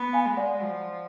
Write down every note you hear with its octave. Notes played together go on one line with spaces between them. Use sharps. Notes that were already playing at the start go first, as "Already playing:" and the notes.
Already playing: B3
F5 G#5
G#3
D5 F#5
F3